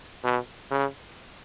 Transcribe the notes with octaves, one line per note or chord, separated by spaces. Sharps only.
B2
C#3